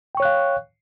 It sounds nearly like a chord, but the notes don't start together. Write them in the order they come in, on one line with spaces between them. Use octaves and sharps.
G5 C#6 C#5 F#6 F5